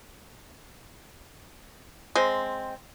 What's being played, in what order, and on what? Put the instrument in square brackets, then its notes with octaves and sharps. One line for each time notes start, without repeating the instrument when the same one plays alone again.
[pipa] G#3 C4